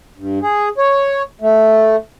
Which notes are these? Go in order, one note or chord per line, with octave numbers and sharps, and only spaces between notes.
G2
G#4
C#5
A3